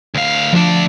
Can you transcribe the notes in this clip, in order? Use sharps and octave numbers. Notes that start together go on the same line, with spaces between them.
D2 F5
D2 F3 D4